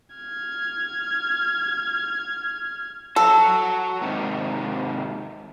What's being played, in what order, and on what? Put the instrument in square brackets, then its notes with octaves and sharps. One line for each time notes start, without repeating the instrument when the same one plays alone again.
[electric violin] F6 G#6
[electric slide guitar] F#3 F#4 [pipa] A4
[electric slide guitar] G#2 C3 D#3